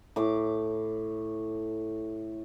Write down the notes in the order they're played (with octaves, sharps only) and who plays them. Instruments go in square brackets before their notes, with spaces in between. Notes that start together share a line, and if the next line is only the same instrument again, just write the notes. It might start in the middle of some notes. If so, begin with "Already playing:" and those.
[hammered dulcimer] A2 D6